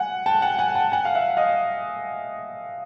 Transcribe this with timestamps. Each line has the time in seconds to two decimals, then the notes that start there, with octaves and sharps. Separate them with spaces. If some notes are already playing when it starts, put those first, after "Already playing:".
Already playing: F#5 G#5
0.26 G5 A5
0.42 F#5 G#5
0.59 F#5 G#5
0.75 G5 A5
0.92 F#5 G#5
1.05 F5
1.15 E5 F#5
1.37 D#5 F5